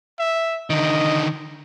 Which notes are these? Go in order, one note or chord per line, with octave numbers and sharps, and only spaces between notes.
E5
D3 D#3 D#5